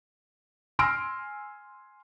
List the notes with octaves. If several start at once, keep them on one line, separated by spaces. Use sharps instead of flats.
G#5 C6 E6 F6 A#6 D7